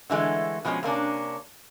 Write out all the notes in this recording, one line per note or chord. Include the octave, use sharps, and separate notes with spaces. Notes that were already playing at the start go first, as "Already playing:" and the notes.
D3 E3 G#3 A3
B2 F3 G#3 C4 C#4
C3 A#3 C#4 D4